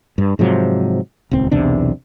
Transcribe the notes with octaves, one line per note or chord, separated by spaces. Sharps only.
G2
G#2 C3 F3 F#3
D#1 C#2 C4
B1 E2 C3 D4